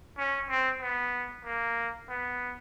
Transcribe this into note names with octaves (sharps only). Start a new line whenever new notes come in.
C#4
C4
B3
A#3
B3